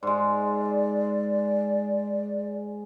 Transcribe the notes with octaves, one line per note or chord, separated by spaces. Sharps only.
G#2 G#3 D5